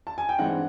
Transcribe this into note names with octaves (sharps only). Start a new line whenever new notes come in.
A5
G#5
G5
G2 E3 G#3 C4 D#4 F#5